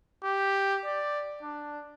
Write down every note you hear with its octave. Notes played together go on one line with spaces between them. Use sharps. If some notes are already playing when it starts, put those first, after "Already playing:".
G4
D5
D4